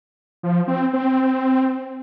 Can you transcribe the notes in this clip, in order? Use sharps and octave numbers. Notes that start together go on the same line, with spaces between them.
F3
C4
C4